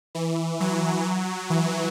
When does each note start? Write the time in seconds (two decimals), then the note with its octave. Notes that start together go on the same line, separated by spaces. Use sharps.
0.15 E3
0.60 F#3
1.50 E3